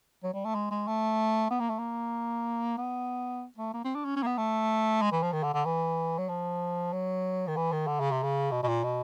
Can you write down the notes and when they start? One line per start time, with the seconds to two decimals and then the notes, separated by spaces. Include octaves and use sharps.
0.24 F#3
0.33 G3
0.45 A3
0.55 G#3
0.71 G#3
0.88 A3
1.51 B3
1.60 A#3
1.70 A3
1.79 A#3
2.78 B3
3.58 A3
3.74 A#3
3.85 C4
3.95 D4
4.05 C#4
4.16 C#4
4.23 A#3
4.26 B3
4.38 A3
5.02 G#3
5.12 E3
5.23 F3
5.32 D#3
5.43 D3
5.54 D3
5.66 E3
6.18 F#3
6.29 F3
6.93 F#3
7.47 D#3
7.57 E3
7.73 D#3
7.87 D3
8.00 C#3
8.11 C3
8.23 C#3
8.52 B2
8.63 B2
8.68 A#2
8.84 B2